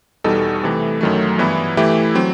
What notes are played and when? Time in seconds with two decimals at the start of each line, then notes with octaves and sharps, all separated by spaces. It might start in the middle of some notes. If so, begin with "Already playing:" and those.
0.24 E2 B2 G3 D#4 A4
0.63 C3 E3 A3
1.01 F#2 D#3 F#3 A3
1.38 G2 E3 B3 E4
1.77 E3 A3 E4 G4
2.15 F#3 C4